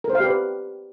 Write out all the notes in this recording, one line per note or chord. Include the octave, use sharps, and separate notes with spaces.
A#4
C5
F5
G4
B4